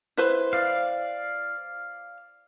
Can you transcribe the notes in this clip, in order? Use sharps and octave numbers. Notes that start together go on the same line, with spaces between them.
E4 B4 C5
D5 F5